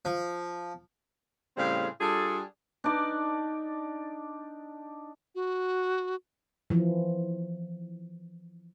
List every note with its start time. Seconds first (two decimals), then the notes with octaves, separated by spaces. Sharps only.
0.05 F3
1.57 A2 C#3 G3 C4 G#4 F5
2.00 G3 D4 F4 G#4 A4
2.84 D4 D#4 D5 D6
5.35 F#4
6.70 E3 F3